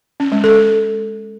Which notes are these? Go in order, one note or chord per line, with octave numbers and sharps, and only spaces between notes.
C#4
G#3
A4